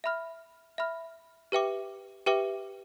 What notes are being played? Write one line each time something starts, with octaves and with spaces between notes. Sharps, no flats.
E5 B5 F6
E5 B5 F6
G4 B4 E5 G5 D6
G4 B4 E5 G5 D6